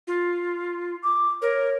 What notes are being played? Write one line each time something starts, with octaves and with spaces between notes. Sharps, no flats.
F4
D6
A#4 C#5